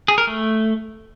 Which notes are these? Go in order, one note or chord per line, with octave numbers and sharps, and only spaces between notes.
G#4
A#4
A3